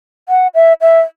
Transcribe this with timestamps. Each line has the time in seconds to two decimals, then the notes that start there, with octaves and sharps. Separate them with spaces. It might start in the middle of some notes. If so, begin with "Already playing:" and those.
0.29 F#5
0.55 E5
0.81 E5